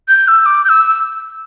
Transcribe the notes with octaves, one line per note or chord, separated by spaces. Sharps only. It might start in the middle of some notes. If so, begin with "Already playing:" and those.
G6
E6
D6
G6
E6